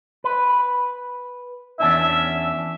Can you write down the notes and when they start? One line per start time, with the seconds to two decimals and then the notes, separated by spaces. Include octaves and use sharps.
0.24 B4
1.80 E2 C#4 D4 E5